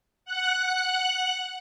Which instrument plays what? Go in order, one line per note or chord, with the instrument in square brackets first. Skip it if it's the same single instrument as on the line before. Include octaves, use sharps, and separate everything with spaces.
[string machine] F#5 F#6